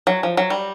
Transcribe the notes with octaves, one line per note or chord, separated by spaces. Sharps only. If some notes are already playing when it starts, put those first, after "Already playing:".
F#3
F3
F#3
G3